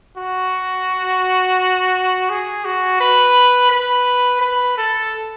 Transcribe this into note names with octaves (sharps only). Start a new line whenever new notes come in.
F#4
G#4
F#4
B4
B4
B4
A4